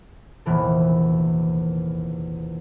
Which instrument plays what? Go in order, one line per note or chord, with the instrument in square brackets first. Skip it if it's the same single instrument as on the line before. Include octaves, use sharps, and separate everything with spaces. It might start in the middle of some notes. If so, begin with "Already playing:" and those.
[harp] D#1 A#1 E2 C3 E3 A4